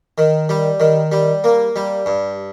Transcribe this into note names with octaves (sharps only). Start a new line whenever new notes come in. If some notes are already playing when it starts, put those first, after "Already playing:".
D#3
G3
D#3
G3
A#3
G3
G2